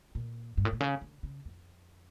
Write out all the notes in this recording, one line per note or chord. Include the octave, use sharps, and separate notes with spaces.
A#2
G2
A2
A#2
C#3
D3
C#3
F2